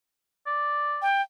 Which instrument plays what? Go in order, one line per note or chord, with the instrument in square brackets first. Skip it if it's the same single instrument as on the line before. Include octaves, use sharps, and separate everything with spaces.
[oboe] D5
[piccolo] G5